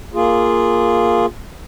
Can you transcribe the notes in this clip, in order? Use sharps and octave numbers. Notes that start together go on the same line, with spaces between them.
A#3 F4 G#4